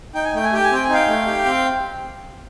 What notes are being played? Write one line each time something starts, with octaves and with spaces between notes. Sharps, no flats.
D#4 G5
G#5
A3 G5
G#5
G4 G5
G#5
C4 G5
G#5
D#4 F5 G5
A3
G4
C4